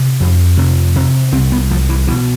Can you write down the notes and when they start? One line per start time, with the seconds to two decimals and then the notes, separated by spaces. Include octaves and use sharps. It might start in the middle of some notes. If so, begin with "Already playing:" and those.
Already playing: C3
0.21 F2
0.57 C3
0.96 C3
1.32 C2 C4
1.52 B3
1.70 C2 F3
1.89 E3
2.07 B2 E3